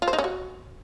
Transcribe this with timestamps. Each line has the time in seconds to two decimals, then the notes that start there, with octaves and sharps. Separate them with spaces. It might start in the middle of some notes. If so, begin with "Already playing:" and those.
0.02 F4
0.08 C5
0.13 D#4
0.19 C#4
0.24 F#4